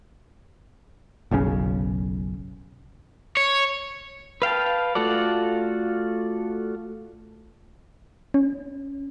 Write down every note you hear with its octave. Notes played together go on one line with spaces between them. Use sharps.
F#1 B1 C#3 C#4
C#5
B4 F5 G5 A5
A3 F4 F#4 A4 D5
C#4